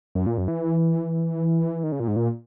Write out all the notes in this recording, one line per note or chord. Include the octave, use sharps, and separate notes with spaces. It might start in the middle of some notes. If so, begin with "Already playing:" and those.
F#2
A#2
F#2
E3
D#3
C#3
A#2
G#2
A#2